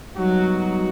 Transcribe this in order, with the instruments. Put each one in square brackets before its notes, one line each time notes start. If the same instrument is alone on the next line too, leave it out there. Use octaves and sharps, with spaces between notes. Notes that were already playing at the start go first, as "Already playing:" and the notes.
[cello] F#3 [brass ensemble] G3 B3 D#4 F#4